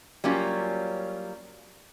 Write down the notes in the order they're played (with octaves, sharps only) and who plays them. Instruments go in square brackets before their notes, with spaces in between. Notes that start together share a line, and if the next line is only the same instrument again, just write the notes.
[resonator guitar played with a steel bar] F#3 G3 A#3 C#4 F4